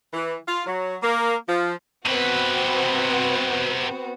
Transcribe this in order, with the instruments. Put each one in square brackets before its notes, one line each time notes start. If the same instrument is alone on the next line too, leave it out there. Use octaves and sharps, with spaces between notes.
[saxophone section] E3
F4
F#3
A#3
F3
[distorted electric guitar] C3 B4 [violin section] B3 C4 F#4